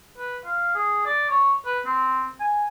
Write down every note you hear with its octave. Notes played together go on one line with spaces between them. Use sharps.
B4
F5
G#4
D5
C#5
B4
C4
G#5